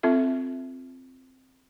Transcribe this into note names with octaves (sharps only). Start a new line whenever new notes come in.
C4 F4 A4 E5